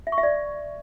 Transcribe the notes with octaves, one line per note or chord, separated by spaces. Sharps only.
E5
C#6
E5
D5